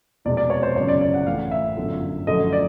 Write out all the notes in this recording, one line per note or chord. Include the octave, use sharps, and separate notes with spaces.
F1 E2 B2 G#3 D5
D5
C#5
C5
G1 F#2 C#3 C#5
D5
D5
F#5
A1 A2 E3 F5
E5
G1 F#2 D3
F#2 D3 F3 A3 D#5
D5